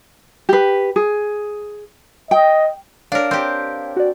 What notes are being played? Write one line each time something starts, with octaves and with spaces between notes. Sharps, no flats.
G4 B4
G#4
D#5 G5
D4 A#4 C#5 F5
C4 G4
F#4 D5